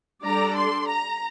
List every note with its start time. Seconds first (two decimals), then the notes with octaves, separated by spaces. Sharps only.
0.25 G3 D4 A4 D5 A#5
0.57 C6
0.88 A#5